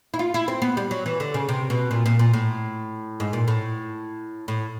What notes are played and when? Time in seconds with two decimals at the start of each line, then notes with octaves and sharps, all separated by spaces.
0.14 E4
0.19 F4
0.34 E4
0.48 C4
0.62 B3
0.77 G3
0.91 F#3
1.06 E3
1.20 D3
1.34 C#3
1.49 C3
1.70 B2
1.91 A#2
2.06 A#2
2.19 A#2
2.33 A2
3.20 G#2
3.33 A#2
3.48 A2
4.48 A2